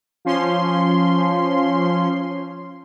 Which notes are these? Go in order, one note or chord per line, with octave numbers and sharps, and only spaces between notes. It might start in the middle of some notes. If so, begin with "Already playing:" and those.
F3 C#4 C6